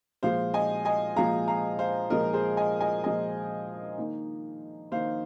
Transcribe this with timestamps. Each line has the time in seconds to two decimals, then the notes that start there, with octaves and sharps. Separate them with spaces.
0.23 A#2 F3 G#3 C5 F5
0.54 D#5 G#5
0.85 D#5 G#5
1.16 A#2 F3 G#3 F5 A#5
1.48 F5 A#5
1.79 C5 F5
2.10 A#2 F3 G#3 A#4 D#5
2.34 G#4 C5
2.57 D#5 G#5
2.81 D#5 G#5
3.04 A#2 F3 G#3 D#5 G#5
3.98 D#3 A#3 D#4
4.92 D#3 A#3 D#4 C5 F5